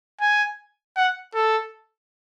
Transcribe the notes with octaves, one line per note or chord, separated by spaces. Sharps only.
G#5
F#5
A4